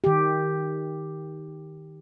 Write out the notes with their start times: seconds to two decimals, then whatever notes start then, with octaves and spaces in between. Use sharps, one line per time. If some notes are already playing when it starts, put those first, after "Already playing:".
0.04 D#3 G4